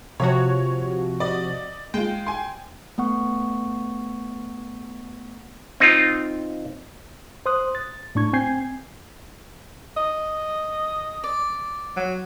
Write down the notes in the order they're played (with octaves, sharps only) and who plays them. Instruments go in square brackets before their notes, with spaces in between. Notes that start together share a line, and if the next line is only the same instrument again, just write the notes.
[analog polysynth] C3 F3 F#4 [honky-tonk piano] C#5
[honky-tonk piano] D5 D#5
[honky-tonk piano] G#3 F4 [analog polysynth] G5
[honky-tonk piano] G#5 C6
[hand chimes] A3 B3 F#5 C#6
[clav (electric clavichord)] C4 D#4 F4
[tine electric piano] C5 C6 D#6 F#6
A6
A2 D4 C#6 G#6
C4 G#5 G6 G#6 C7
[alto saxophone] D#5
[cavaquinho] D5
[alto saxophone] F#3